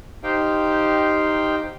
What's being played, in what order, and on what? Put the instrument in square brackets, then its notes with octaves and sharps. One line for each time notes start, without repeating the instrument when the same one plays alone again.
[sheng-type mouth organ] D#4 G4 C5 F5 G5